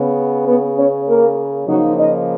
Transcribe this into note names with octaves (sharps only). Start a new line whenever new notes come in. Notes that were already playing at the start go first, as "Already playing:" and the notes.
Already playing: C#3 B3
B3 B4
C#4 C#5
A#3 A#4
C#3 F3 F#3 A#3 D#4 F#4
D#4 D#5